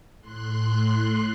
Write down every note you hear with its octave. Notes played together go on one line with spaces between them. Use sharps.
A2 C6 F#6